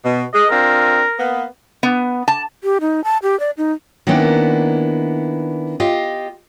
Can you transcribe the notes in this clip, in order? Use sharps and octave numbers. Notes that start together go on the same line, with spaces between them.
B2
G#3 D#5
C4 D4 F4 A#4
A#3 B3
B3
A5
G4
D#4
A5
G4
D5
D#4
D#3 A#3 B3 C#4 D4 E4
F4 G4 D#5 F5